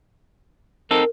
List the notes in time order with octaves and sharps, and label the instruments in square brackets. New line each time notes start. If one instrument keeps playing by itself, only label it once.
[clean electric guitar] C4 D#4 A4 [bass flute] A#4